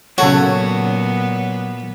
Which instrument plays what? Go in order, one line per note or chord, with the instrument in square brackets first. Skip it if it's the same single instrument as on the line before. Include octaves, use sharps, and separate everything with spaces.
[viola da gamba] A#2 B3 [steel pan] C#3 A4 C#5 [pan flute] F#3 [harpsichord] F#4